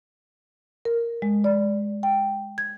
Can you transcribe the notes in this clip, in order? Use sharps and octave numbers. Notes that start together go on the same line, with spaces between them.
A#4
G#3
D5
G5
G#6